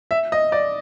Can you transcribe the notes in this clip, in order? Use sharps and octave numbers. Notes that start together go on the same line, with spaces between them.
E5
D#5
D5